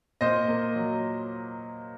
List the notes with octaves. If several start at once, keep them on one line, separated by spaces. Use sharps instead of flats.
A#2 C5 D#5
A#3
F#3